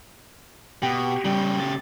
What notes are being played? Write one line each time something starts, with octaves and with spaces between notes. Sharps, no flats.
B2 G4
C#3 G3 G4
A6